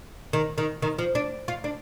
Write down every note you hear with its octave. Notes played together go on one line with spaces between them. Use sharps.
D#3
D#3
D#3
F3
D4
F4
D4